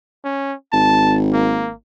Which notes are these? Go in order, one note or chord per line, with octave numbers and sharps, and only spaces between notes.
C#4
G#1 A5
A#3